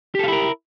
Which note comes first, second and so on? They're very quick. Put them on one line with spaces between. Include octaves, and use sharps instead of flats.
G4 A4 F5 E4 A#4